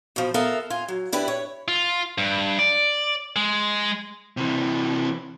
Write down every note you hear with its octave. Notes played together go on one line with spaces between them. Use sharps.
B2 F3
B3 A4 A#4 E5 F5
F4 G#5
F#3
D4 E4 G4 B4
C#5
F4
G2
D5
G#3
C3 E3